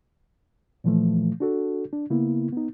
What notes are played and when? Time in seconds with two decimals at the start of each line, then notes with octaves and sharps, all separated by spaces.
0.84 A#2 E3 F3 A3
1.40 D4 F#4 A4
1.93 D4
2.10 C#3 A#3 B3 E4
2.53 B3 D#4